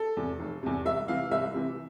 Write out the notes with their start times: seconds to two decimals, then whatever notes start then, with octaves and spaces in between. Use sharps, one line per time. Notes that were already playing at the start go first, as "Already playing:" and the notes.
Already playing: A4
0.17 E2 C3
0.39 F1
0.63 E2 C3
0.85 C2 E5
1.08 C3 E3 F5
1.31 C2 E5
1.54 C3 E3